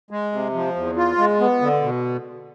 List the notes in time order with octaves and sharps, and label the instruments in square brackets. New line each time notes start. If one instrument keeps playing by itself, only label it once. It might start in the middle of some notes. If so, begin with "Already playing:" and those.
[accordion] G#3
C3
F3
E2
F4
G#3
B3
D3
B2